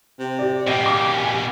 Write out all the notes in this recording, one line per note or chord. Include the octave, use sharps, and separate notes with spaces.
C3
G4 D5
B2 A#3 G4 D#5
D6
G#5